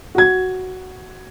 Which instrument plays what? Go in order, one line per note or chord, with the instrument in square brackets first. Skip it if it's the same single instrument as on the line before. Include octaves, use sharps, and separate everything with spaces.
[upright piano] F#4 G#6